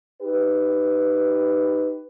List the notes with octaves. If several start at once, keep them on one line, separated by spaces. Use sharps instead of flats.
D#4 G4 B4